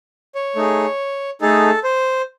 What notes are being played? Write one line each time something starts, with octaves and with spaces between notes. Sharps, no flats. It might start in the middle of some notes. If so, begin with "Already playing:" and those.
C#5
A3 D#4 G#4
A3 D#4 G#4 A4
C5